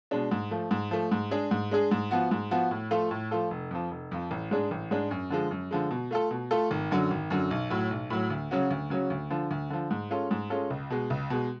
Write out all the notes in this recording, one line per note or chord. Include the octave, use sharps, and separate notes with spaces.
B2 G#3 D4
G#2
F3 A3
G#2
F3 A3
G#2
G#3 D4 G#4
G#2
G#3 D4 G#4
G#2
F3 B3 F#4
G#2
F3 B3 F#4
A2
F3 A3 F4 A4
A2
F3 A3 F4 A4
F1
F2 F3
F1
F2 F3
A1
G#2 G#3 D4 G#4
A1
G#2 G#3 D4 G#4
F#2
D3 F3 G#3
F#2
D3 F3 G#3
B2
A3 F4 A4
B2
A3 F4 A4
G#1
F#2 D3 F#3
G#1
F#2 D3 F#3
B1
A2 F#3
B1
A2 F#3
D2
C#3 F#3 C#4 F#4
D2
C#3 F#3 C#4 F#4
D2
D3 F3
D2
D3 F3
G#2
G#3 C#4 F4 A4
G#2
G#3 C#4 F4 A4
C#2
B2 G#3
C#2
B2 G#3